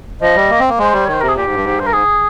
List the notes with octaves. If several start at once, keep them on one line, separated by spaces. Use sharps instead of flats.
F3 D#5
G3
A#3
C4
A#3
G#3 C5
G3
D#3 C#5
C5
C3 A#4
G#4
A#2 G4
G#2
G2
G#2
G2 C5
A#4
G#2 G#4